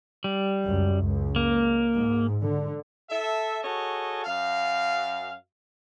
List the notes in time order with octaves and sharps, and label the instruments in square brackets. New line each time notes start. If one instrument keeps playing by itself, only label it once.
[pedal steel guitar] G3
[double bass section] C#2 F#2
C#2
[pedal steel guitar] A#3
[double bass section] G#2
D3
[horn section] A4 E5
F#4 G#4 A4 C#5 D#5
F#2 F5